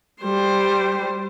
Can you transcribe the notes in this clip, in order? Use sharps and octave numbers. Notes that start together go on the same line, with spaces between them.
G3 C5